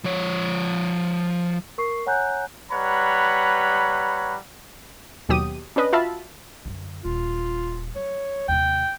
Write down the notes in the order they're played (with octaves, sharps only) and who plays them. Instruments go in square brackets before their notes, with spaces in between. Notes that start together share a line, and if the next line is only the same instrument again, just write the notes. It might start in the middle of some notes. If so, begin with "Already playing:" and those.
[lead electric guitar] F3 C#5
[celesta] A#4 C#6 C7
C#5 F#5 G#5 A#5 F#6 G6
[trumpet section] G3 B4 C#5 F#5 A#5 B5
[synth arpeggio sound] D#2 B2 F#3 G4 D#6 D#7
C#4 D4 B4 D#5
F4 F#4 E5 F5 A5 B5
[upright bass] F#2 D3
[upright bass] D#1 [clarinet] F4
[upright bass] F#3 [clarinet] C#5
[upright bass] D#2 C3 [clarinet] G5